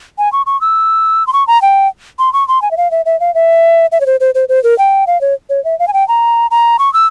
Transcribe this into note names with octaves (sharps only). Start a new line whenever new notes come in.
G#5
C#6
C#6
E6
C6
C#6
A#5
G5
C6
C#6
C6
G#5
E5
F5
E5
E5
F5
E5
E5
C#5
C5
C5
C5
C5
A#4
G5
F5
C#5
C#5
E5
F5
G#5
G5
A#5
A#5
C#6
E6